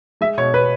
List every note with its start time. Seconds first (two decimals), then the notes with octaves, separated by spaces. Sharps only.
0.21 G#3 E5
0.37 B2 C#5
0.53 B2 B4